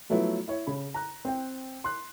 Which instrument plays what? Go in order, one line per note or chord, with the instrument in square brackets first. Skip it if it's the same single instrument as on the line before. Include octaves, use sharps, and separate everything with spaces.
[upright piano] F3 F#3 A3 B3 E4 F#4
E4 C#5
C#3 B5
A#5 F#6
C4 G5
C6 F#6